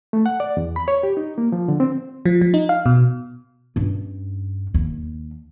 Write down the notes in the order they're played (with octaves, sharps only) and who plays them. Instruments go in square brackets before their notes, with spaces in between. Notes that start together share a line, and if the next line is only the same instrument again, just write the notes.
[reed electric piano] A3
F#5
D5
E2
B5
C#5
G4
D#4
A#3
F3
D3
C4
[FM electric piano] F3
F3
D#4
F5
B2
[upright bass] G2 C#4
D#2